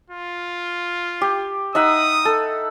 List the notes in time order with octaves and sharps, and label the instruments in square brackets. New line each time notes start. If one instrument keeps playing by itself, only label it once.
[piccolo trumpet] F4
[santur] G4
[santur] D#4 E5 F#5 [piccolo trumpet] D#6
[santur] A4